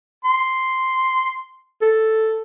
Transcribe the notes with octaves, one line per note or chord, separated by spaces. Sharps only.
C6
A4